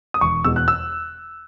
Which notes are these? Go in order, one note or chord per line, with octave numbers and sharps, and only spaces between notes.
D#6
E1 C#6
E2 B2 G#3 E6
F#6
E6